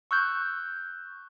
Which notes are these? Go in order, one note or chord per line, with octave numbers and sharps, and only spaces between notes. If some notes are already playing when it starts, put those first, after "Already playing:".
C#6 E6 F#6 G6